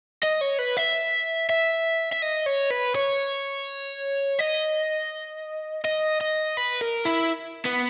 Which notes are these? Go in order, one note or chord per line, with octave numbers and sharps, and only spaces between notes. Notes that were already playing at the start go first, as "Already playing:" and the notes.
D#5
C#5
B4
E5
E5
E5
D#5
C#5
B4
C#5
D#5
D#5
D#5
B4
A#4
E4
B3